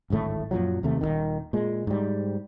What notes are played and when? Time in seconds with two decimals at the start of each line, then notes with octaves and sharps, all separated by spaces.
0.10 D1 G#1 A2 A3
0.51 F#2 A#2 F3 F#3
0.83 D#2 C3 A3
1.01 D#1 B1 D#3
1.53 A#2 G#3
1.87 G#2 G3